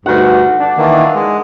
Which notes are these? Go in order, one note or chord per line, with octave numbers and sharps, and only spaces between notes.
D2 G2 D#4 F#5
D4
D#3 E3 A#3
G#3